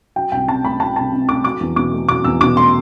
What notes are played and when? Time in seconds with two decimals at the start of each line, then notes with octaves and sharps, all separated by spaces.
0.16 F#3 G5
0.32 C2 G5
0.48 C3 A5
0.64 A3 B5
0.80 F#3 A5
0.96 C2 A5
1.13 C3
1.29 A3 D6
1.44 F#3 D6
1.61 E2
1.76 B2 D6
1.93 A3
2.08 F#3 D6
2.24 E2 E6
2.41 B2 D6
2.57 A3 C6